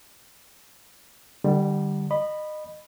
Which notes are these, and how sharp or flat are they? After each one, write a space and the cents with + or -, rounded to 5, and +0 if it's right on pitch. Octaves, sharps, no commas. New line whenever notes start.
D3 +35 G3 +0
D#5 -25 B5 +0